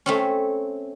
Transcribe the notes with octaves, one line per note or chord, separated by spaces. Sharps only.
A3 C4 C#4